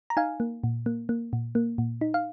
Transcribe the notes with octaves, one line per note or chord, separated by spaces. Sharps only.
A#5
D#4 F5 G#5
A#3
A#2
A#3
A#3
A#2
A#3
A#2
D#4
F5